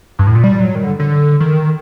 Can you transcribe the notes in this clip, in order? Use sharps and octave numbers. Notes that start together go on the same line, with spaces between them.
G2
A2
A#2
G3
F#3
D#3
D3
D3
D#3